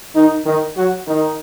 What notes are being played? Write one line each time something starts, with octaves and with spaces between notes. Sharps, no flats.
D#3 D#4
D#3 D#4
F#3 F#4
D#3 D#4